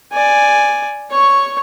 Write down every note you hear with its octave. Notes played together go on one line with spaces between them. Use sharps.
D5 G#5
C#5 C#6